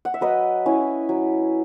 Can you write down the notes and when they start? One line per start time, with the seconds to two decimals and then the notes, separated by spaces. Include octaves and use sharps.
0.05 F#5
0.14 E5
0.21 F#3 B4 D#5
0.66 C#4 E4
1.09 F#3